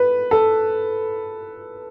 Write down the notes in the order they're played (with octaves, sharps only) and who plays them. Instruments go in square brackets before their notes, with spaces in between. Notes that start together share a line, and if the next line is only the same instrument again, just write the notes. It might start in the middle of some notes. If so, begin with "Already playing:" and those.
Already playing: [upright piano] B4
A4